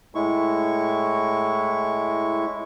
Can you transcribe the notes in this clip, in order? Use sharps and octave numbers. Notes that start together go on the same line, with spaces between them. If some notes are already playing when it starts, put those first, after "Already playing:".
A2 G#3 E4 C#6